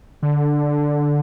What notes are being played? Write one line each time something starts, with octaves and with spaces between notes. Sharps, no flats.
D3